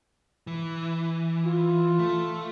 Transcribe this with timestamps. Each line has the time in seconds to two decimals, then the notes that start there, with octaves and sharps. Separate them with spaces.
0.47 E3
1.45 F4
1.99 A3